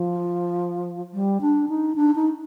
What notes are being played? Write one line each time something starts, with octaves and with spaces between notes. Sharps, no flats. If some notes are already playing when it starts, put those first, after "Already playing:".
Already playing: F3
G3
D4
D#4
D4
D#4